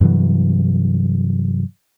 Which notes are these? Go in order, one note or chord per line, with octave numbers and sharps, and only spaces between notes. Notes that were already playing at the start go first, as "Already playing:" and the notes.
G2 C3 E3 F#3